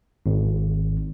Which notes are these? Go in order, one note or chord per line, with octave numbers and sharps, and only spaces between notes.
G#1